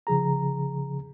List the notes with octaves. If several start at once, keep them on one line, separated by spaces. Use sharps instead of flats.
C#3 F3 G#4 A#5